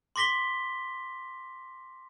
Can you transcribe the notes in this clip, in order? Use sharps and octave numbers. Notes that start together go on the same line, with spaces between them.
C6 D6 A#6 B6 G7